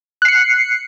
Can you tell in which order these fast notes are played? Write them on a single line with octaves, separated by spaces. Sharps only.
F#6 C7 C#7